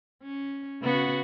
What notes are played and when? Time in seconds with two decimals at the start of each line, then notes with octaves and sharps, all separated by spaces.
0.23 C#4
0.82 C#3 B3 F#4